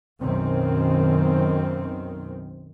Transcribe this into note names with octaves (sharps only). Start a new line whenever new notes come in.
B1 F#2 D#3 C4